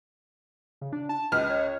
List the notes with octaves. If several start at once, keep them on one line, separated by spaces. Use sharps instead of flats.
C#3
D4
A5
C#2 B4 F6
C#5